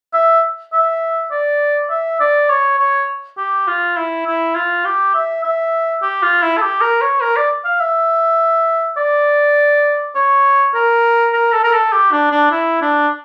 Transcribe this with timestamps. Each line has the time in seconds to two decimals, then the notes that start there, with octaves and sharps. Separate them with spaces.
0.14 E5
0.73 E5
1.31 D5
1.90 E5
2.20 D5
2.49 C#5
2.79 C#5
3.38 G4
3.68 F4
3.97 E4
4.26 E4
4.56 F4
4.85 G4
5.14 E5
5.44 E5
6.02 G4
6.23 F4
6.42 E4
6.57 A4
6.62 G4
6.81 A#4
7.01 C#5
7.21 A#4
7.36 D5
7.65 F5
7.80 E5
8.97 D5
10.15 C#5
10.74 A#4
11.33 A#4
11.53 A4
11.63 A#4
11.73 A4
11.92 G4
12.12 D4
12.32 D4
12.51 E4
12.82 D4